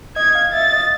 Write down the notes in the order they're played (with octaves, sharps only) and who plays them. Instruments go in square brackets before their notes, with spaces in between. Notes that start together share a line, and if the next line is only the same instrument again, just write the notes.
[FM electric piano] D#5 [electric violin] G#6
[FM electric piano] F5
[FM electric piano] E5 [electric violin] A6
[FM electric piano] D#5